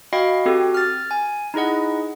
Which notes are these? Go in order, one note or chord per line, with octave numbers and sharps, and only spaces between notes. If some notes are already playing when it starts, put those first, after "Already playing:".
F#4 D#5 F5 G5 B5
C4 F#4 G4 A4
F6 A6
G#5
D#4 E4 G#4 D#5 F#5